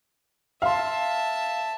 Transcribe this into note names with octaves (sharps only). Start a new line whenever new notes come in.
E5 F5 A5 C6